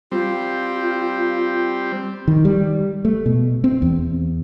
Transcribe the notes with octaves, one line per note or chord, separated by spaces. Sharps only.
G3 C4 F4
D#3
G3
A3
B2
C4
E2